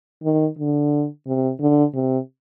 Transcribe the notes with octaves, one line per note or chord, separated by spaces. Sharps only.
D#3
D3
C3
D3
C3